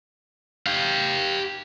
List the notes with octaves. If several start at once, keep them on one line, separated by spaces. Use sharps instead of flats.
G4 F5